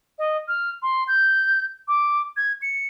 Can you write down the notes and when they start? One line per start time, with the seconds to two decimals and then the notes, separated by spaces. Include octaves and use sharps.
0.19 D#5
0.48 F6
0.82 C6
1.08 G6
1.88 D6
2.37 G#6
2.62 C#7